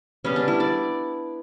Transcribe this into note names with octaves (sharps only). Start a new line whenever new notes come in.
C#3 G3 B3 C#4
D4
E4
D5